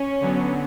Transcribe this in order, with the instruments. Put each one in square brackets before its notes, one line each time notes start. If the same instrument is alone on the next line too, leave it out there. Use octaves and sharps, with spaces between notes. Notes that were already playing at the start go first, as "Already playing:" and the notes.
Already playing: [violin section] C#4
[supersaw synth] D3 F#3 B3